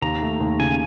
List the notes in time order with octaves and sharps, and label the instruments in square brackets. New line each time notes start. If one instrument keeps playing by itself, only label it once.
[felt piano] D#2 [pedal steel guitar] A#5
[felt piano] A3
D#2
[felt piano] C#3 [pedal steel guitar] G#5